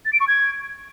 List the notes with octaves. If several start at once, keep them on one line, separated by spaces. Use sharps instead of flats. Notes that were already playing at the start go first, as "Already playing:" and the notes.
A6
D7
C#6
G#6